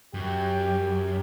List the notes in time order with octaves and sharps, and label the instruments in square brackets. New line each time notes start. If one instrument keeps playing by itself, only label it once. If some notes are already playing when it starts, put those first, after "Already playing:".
[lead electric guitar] F#2 [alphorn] G4